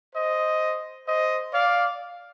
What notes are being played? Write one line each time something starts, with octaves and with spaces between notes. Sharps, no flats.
C5 D#5
C5 D#5
D5 F5